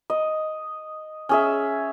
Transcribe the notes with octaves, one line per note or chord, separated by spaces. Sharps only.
D#5
C#4 G#4 E5